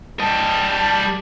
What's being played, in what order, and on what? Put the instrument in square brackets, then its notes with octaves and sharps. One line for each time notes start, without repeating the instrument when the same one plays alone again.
[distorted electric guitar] G3 D#5 [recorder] A5